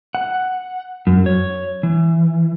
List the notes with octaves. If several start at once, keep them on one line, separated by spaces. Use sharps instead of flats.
F#5
F#2
C#5
E3